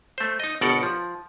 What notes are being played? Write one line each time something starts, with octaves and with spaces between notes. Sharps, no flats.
A3 C5
D#4 D#5
G1 B2 A4 A#4 D5 F#5
F3